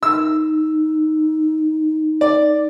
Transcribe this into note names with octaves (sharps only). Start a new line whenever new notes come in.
D#4 E6
D5